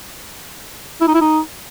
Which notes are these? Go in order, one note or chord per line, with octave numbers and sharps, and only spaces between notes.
E4
D#4
E4
D#4